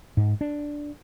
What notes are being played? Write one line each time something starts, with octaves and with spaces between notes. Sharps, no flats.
G#2
D4